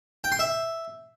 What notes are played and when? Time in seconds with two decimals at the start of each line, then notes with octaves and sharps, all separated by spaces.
0.24 G5
0.32 C6
0.39 E5